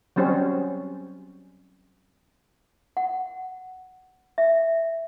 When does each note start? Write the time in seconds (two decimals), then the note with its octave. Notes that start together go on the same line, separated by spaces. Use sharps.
0.16 F#3 G3 C4 C#4
2.97 F#5
4.38 E5